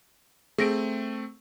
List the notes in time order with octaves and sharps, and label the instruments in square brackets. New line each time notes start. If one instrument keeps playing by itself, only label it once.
[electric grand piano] A3 C4 [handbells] G#4 A#6 D7